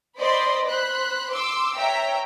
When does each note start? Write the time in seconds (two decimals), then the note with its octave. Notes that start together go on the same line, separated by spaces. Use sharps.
0.17 C5 D5 D#5 B5 C6
0.65 C5 B5 F#6
1.31 C6 D6 E6
1.76 C#5 E5 G5 A#5